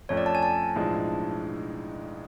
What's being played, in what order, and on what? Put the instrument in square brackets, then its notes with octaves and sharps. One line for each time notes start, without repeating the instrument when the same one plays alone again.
[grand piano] F2 F3 A3 C#4 [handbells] C#5
[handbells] D5
A5
G#5
A5
[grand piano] B1 A2 F3 G#3 D4